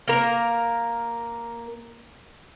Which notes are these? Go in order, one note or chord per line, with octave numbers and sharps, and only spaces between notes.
A#3 A#4